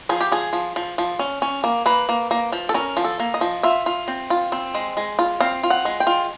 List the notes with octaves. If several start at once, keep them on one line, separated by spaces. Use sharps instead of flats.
F3 G#4
G4
F3 G#4
F3
F3
F3
C#4
C#4
A#3
A#3 B4
A#3
A#3
F3
A4
C#4 A#4
F3
A4
A#3
D#5
F3
F4 E5
F4
C4
F4
C4
G#3
G#3
F4
C4 F5
F4
F#5
G#3
G5
F4